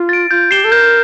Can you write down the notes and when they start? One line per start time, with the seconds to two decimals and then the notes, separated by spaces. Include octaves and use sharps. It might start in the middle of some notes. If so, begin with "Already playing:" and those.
Already playing: F4
0.09 A6 D7
0.30 F4 G6
0.51 G4 C7 E7 G7
0.64 A4
0.72 A#4 G6